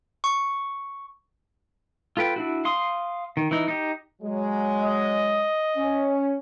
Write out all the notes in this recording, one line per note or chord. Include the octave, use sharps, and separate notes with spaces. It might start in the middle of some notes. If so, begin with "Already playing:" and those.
C#6
F4 A4 B4 G5
D4 E4 F#4
F5 C6 D#6
D#3
E3 D#4
D#4 G4
F#3 G#3
D#5
C#4